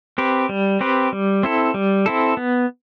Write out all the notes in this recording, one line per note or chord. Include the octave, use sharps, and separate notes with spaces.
C4 G4 B4
G3
C4 G4 B4
G3
C4 E4 A4
G3
C4 E4 A4
B3